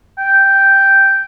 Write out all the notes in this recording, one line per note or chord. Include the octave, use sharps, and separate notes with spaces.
G5